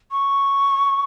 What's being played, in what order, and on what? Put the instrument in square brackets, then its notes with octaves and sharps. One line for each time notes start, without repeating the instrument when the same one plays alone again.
[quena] C#6